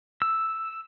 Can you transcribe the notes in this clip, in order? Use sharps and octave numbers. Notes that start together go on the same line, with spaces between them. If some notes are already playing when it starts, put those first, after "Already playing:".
E6